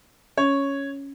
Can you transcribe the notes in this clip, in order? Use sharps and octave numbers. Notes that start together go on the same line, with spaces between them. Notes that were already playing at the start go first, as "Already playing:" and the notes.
C#4 C#5